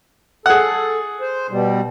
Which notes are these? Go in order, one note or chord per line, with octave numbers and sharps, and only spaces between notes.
G#4 A4 F#5
C5
B2 G3